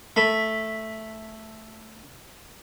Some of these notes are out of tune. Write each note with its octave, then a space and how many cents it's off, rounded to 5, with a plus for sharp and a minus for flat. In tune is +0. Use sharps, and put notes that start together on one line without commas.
A3 +0 B5 +0